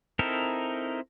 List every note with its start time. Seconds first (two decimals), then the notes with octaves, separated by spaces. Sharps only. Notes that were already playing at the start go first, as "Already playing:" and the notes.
0.19 C4 D#4 E4 A4 A#4